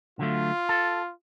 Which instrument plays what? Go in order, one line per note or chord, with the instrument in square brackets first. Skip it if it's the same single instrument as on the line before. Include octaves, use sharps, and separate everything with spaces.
[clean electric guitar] D3 F#3 A3 [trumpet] F4
[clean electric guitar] A4